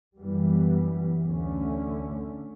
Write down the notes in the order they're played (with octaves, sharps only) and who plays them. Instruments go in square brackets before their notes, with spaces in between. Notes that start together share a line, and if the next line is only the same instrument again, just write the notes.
[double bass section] F#2 E3 G3 B3
D2 D3 A3 C#4